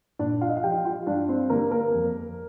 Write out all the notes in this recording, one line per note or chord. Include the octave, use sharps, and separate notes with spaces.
A#2 D4 D5
F4 F5
D#5
F5
F3 G4 G5
F4 F5
G2 D4 D5
C4 C5
D3 G3 A#3 A#4
A#3 A#4
F2